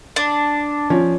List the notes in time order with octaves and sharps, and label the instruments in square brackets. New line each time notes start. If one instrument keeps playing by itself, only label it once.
[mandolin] D4
[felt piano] F3 C#4